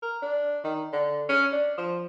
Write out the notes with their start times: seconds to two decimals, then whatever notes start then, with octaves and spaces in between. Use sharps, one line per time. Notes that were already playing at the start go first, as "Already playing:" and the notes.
0.02 A#4
0.22 D4
0.64 D#3
0.93 D3
1.29 C#4
1.52 D4
1.78 F3